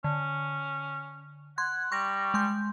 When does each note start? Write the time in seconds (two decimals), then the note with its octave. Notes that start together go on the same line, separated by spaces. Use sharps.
0.04 D3 C#4
1.58 F#5 C6 G#6
1.92 G3 C#6 A#6
2.34 G#3 C6 G6